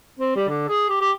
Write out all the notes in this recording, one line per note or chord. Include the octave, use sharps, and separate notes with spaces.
C4
G3
D3
G#4
G4
G4